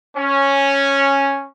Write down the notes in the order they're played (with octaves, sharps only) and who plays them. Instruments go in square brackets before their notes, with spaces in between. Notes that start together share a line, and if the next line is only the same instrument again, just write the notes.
[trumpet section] C#4